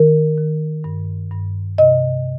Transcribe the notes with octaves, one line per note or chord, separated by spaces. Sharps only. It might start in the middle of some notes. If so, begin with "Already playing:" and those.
Already playing: D#3 A#4
D#3
G2
G2
C3 D#5